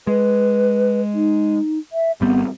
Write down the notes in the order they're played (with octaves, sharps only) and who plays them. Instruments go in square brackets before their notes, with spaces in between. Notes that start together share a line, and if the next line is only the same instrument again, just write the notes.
[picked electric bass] G#3 [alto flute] B4
[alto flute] D#4
E5
[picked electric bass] G#1 G3 C4 [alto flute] B3